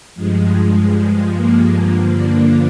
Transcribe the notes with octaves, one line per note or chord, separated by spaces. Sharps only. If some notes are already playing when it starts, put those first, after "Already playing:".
G2 F3 G#3
A#3
G2 D3 F3 A#3
D4